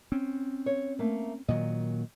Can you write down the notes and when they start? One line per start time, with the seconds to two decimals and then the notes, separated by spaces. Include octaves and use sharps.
0.12 C4 C#4
0.66 C#5
0.99 A3 A#3
1.48 A#2 D#3 F#3 D#5